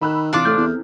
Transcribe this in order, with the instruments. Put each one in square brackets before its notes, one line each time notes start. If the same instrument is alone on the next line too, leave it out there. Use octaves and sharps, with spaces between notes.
[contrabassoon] D#3 [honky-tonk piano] B5 E6 F#6
[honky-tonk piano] C3 E3 [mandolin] D4 F4 D6
[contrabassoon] A2 [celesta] A4 F6 G6
[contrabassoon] E2